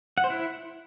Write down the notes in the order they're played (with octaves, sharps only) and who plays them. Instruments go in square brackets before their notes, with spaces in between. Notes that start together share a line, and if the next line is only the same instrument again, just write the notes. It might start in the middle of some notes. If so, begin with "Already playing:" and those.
[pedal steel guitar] F#5
C5
E4